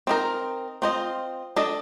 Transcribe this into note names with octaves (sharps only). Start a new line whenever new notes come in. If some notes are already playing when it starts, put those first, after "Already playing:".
C4 D#4 A#4
C4 F4 C5 D#5
D4 A4 D#5